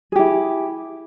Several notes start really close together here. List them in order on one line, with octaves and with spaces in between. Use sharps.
G#4 G4 E4